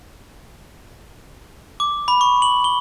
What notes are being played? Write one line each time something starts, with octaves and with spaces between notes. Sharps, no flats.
D6
B5
C#6
F#7
G7